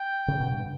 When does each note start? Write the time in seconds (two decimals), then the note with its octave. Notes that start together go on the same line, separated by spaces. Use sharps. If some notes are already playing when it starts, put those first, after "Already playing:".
Already playing: G5
0.28 C#3
0.40 B2
0.52 G2